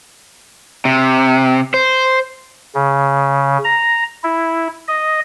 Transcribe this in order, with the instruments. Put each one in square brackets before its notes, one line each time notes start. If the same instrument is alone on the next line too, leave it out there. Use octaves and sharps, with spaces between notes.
[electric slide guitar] C3
C5
[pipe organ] C#3
A#5
E4
D#5